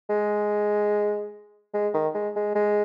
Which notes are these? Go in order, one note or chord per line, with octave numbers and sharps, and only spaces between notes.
G#3
G#3
D#3
G#3
G#3
G#3